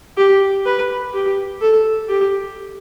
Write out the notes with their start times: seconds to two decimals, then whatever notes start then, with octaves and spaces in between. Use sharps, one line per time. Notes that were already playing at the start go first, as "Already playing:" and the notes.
0.17 G4
0.66 B4
1.14 G4
1.61 A4
2.09 G4